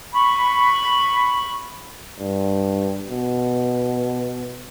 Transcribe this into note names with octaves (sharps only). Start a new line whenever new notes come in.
B5 C#6
G2
B2